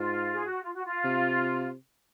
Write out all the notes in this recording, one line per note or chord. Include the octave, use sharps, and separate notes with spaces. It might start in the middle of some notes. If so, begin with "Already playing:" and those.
Already playing: G#2 F4
G#4
F#4
F4
F#4
F4
C3